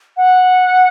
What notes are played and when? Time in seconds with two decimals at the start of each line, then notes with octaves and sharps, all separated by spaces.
0.17 F#5